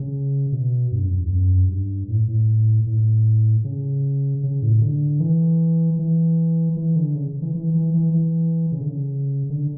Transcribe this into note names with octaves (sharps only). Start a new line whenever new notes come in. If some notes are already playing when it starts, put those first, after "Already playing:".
Already playing: C#3
B2
G2
F#2
F#2
E2
F#2
G2
A2
A2
A2
C#3
C#3
A2
D3
E3
E3
E3
D3
C#3
E3
E3
E3
E3
E3
C#3
D3
C#3
D3